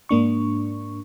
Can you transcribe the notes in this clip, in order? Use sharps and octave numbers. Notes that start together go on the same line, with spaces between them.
G#2 A#3 D4 C#6